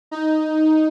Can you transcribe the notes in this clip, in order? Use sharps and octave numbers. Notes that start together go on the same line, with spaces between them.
D#4